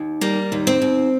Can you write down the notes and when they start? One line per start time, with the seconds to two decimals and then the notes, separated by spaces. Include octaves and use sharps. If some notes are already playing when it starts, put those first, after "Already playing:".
Already playing: D#2
0.21 G3 A#3
0.52 D#2
0.67 C4
0.82 D#2